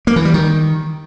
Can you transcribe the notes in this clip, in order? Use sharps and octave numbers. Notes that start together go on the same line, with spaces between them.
A#3
E3
G3
D#3